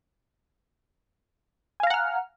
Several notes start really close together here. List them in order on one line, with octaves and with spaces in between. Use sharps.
G#5 F5 A#5 F#5 F6